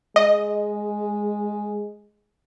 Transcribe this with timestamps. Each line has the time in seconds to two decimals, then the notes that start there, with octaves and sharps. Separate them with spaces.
0.16 G#3 D#5